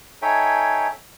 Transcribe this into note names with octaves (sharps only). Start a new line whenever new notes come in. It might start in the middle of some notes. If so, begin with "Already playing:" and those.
D#4 A4 C#5 E5 G5 G#5